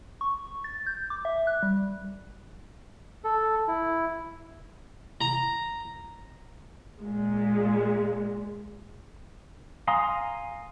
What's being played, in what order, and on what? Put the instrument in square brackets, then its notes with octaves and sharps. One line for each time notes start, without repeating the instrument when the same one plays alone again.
[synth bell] C#6
A6
G6
D6
E5
F#6
G3
[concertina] A4
E4
[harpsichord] A#5
[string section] A#2 G#3
[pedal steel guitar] F5 G#5 A#5 C6 D#6